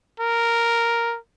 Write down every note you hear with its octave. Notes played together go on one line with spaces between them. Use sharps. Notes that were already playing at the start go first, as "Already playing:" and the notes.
A#4